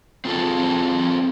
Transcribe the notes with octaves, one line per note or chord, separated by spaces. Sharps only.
C4 F4 G#4 A4